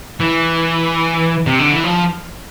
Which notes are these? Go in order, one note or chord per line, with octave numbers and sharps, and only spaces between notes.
E3
C3
D3
E3
F3